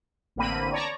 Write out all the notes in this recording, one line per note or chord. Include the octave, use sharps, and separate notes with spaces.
A1 D3 A#3 C4 B5 D#7
C#5 D5 A5 A#5